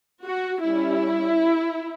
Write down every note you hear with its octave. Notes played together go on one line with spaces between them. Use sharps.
F#4
G3 C#4 E4